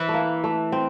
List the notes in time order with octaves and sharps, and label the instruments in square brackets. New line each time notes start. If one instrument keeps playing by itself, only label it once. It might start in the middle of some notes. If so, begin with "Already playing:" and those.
Already playing: [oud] E3
[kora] A3
A#3
A3
C4